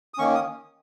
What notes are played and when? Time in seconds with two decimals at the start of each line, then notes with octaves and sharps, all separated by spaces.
0.14 D#6
0.18 D#3 A#3 C#4 C#6
0.35 D#6